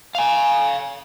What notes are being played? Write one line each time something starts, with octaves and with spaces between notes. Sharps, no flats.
F5 G#5